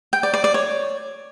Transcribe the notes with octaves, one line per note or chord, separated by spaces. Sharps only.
G5
D5
D5
D5
C#5